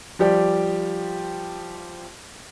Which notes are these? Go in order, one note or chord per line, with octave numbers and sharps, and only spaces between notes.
F3 G3 G4 D5